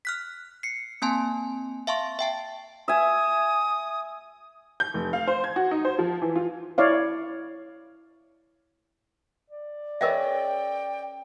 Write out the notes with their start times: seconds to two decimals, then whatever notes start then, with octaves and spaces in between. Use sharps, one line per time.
0.05 F6 F#6 B6
0.63 C7 C#7
1.02 A#3 C4 G#5 A5 C6
1.87 E5 F5 A5 C6 C#6
2.19 E5 G5 A5
2.88 E5 G#5 D#6
4.80 G6
4.94 F1
5.13 F5
5.28 C5
5.44 G#6
5.56 F#4
5.71 D#4
5.85 C5
5.99 F3
6.22 E3
6.36 F4
6.78 E4 C#5 D5 F5
9.50 D5
10.01 C#4 G#4 A#4 B4 D#5 E5 G5